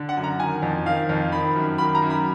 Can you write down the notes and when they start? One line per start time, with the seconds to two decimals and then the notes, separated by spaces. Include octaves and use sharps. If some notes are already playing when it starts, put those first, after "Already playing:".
Already playing: D3
0.09 F#5
0.17 F#2
0.24 A#5
0.39 D#3 G#5
0.62 F2
0.86 D#3 F5
1.09 F2
1.32 D#3 B5
1.56 F#2
1.78 D#3 B5
1.95 A#5
2.02 F#2
2.10 B5